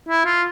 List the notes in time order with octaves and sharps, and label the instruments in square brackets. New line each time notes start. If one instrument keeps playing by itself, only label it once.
[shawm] E4
F4